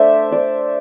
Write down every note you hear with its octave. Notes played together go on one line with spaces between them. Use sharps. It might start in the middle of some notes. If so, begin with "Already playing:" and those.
Already playing: A3 D4 C5 D5 E5
D4 D5